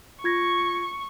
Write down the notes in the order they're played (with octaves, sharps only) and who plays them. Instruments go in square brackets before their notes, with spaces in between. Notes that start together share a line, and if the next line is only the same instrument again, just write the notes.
[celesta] F4 G#6 A#6 [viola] C#6